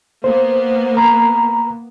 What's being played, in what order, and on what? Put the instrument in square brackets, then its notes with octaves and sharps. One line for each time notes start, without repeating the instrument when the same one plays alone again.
[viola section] A#3 B3 [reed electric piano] C5
[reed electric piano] A#5 B5